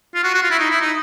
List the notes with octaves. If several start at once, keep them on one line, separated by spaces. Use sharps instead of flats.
F4
F#4
F#4
F4
E4
D#4
E4
D#4